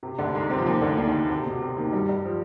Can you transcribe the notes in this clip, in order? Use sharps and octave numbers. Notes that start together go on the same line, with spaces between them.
C3
D2 D3
G#2 G#3
C3 C4
F3
D#2 D#3
D2 D3
D#2 D#3
D#2 D#3
C3
B2
C3
D#2 D#3
G2 G3
G2 G3
F3